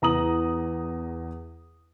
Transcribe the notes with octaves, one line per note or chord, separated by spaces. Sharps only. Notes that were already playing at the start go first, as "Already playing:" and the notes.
E2 A#5 D#6 F#7